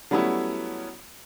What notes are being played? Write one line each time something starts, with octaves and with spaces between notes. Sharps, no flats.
F#3 G3 A3 B3 C#4 E4